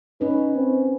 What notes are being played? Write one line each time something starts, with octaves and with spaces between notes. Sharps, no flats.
C#4 D#4 B4
C4